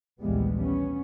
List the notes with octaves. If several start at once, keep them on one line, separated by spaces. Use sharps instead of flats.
A#1 D#2 E3 G3 G#3 B3
B3 C#4